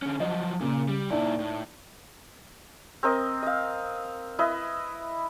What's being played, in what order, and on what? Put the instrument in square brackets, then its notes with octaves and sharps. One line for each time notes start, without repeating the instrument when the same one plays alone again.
[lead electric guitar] D3 C#4
[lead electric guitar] F3 F#3 [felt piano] D#5
[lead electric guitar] A#2 [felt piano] C#3
[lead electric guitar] G3
[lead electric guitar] A#2 E4 [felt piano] D#4 D5
[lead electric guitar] A2
[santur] C4 A#4 D#5
D#5 F5
E4 B4 D#5